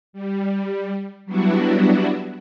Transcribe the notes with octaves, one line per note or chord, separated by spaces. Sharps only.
G3
F#3 G3 B3 D4 E4 F#4